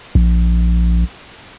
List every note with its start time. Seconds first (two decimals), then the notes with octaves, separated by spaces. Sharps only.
0.15 A#1